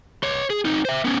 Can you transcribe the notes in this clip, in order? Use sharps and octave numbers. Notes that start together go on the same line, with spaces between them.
C#5 C6
G#4
C4 D#4
C5 E5
B3 C#4